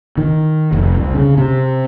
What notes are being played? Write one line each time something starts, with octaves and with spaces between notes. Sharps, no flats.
D#3
F1
C2
C#3
C3